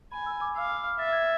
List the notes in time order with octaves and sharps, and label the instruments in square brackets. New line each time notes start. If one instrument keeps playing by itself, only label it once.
[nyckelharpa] G#5 [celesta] B5
[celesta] E6
D6
[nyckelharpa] F5 [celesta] E6
[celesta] F6
[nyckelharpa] E5 [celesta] A6
[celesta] G#6